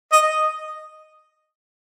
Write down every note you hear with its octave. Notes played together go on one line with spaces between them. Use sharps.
D#5